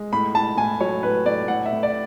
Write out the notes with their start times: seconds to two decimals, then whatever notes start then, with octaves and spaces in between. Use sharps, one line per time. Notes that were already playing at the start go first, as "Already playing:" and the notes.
Already playing: G#3
0.12 A2 B5
0.35 A2 A5
0.57 A2 G#5
0.81 F#3 C#5
1.03 A2 B4
1.26 A2 D5
1.48 A2 F#5
1.66 E5
1.72 A2
1.83 D5